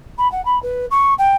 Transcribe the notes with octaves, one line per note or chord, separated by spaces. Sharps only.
B5
F#5
B5
B4
C#6
G5